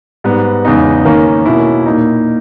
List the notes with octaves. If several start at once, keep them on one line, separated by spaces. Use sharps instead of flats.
G#2 G3 B3
E2 C#3 G#3 B3 D#4
D#3 A#3 C#4
B2 A#3 C#4 E4
A#2 A#3 D#4